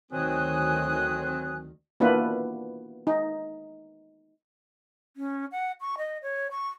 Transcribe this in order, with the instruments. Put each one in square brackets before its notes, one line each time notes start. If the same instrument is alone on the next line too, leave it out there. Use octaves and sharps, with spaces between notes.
[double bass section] D2 D#3 [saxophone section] F#3 C4 [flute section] G#5 D#6 F#6
[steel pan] A#3 B3 D4 E4 F4 B4
D#4
[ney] C#4
F#5
C#6
D#5
C#5
C#6